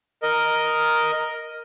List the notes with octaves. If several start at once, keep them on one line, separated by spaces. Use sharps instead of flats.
A#4 D#5